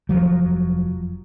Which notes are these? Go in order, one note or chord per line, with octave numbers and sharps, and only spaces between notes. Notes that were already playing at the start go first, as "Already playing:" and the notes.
F1 F3 F#3